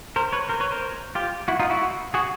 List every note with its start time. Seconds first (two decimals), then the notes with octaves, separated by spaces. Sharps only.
0.16 A#4 C5
0.33 B4 C#5
0.49 A#4 C5
0.60 B4 C#5
0.71 A#4 C5
1.15 F4 G4
1.48 E4 F#4
1.59 D#4 F4
1.70 E4 F#4
2.14 F#4 G#4